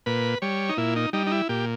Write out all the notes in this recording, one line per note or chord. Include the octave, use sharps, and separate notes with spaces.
A#2 B4
G3 C#5
D#4
A#2 E4
D#4
G3 D#4
D#4
E4
A#2 G4